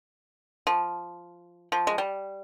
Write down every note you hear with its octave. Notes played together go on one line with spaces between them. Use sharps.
F3
F3
G#3
G3